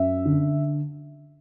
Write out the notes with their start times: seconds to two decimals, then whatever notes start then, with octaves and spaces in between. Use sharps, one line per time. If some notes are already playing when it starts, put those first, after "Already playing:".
Already playing: F#2 E5
0.25 D3